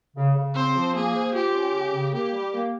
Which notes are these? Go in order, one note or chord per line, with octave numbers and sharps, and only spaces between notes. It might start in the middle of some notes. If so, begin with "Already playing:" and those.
C#3
C#3
C4 C5
F3
A#3 G#4
C5
F4 G4
C#4
C#3
C#3
A#3 G4
G3
A#3